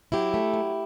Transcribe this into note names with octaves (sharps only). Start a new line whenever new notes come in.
F#3 E4 G4
A3
F#3